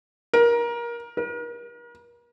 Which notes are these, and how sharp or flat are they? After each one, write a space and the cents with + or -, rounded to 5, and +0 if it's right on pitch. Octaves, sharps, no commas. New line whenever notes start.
A#4 +20
A#4 +40